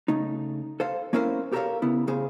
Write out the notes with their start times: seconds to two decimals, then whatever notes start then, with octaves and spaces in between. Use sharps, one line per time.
0.08 C#3 A3 D#4
0.80 A4 C5 F5
1.13 A#3 C#4 E4 A#4 C5 F5
1.52 G4 A4 A#4 C5 C#5 F5
1.82 C#3 B3 E4
2.07 A2 C#3 G#4 C5 F5